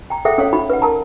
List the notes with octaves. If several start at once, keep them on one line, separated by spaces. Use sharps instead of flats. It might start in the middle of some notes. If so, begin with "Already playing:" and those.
G5 A#5
G#4 A4 C5 E5 F#5 G5
C#4 A4 C5 C#5 F5
D#4 F#4 B5
B4 F#5
A#4 A5 A#5